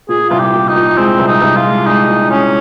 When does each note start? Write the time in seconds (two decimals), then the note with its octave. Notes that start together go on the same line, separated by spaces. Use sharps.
0.09 A#2 G#4
0.29 C2 F4
0.39 G4
0.54 A#2
0.68 D#4
0.75 A#2
0.97 G#3 C4
1.19 C2
1.27 D#4
1.41 C2
1.56 F4
1.64 G#3
1.86 G#3 D#4
2.08 A#2
2.30 G#3 C#4